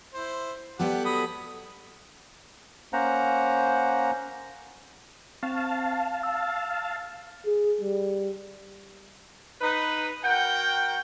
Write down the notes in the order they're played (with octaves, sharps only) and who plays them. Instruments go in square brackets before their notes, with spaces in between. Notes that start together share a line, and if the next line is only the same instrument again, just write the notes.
[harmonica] E4 C5
[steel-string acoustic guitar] G3 B3 A4 [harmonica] G4 F#5
[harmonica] F#3 B5 D#6
[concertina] A#3 C#4 C5 F#5 A#5
[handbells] C4 [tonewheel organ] F5 A5
[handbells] E6
[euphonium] G#4
G3
[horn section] D#4 B4
F#4 A#4 F#5 G5